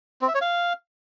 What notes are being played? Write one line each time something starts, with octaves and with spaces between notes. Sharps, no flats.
C4
E5
C#5
F5